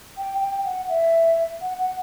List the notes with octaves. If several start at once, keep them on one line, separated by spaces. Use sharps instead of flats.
G5
G5
F#5
E5
F#5
F#5